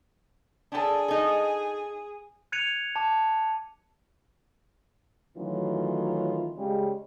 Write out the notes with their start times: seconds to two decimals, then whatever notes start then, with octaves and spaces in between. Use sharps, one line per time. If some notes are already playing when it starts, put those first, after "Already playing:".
0.72 D4 G#4 A4
1.08 D#4 A4
2.52 F#6 G#6 C#7 D#7 F7
2.96 A5 D6
5.36 D#3 E3 F#3 A3 C#4 F4
6.57 C#3 G3 G#3